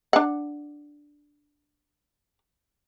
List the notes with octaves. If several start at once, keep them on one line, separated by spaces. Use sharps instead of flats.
D4 F#5